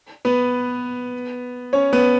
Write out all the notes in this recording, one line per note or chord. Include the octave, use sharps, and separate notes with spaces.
B3 B4
C#4 C#5
B3 B4